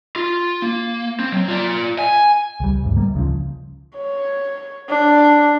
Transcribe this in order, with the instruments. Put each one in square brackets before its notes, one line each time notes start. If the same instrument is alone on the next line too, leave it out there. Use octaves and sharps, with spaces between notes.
[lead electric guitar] F4
A#3
C4
F#3
F4 D5
G#5
[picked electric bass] C#2 G3
C#2 G#2
G3 A#3
C#2 C#3 F3
[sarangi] C#5
D4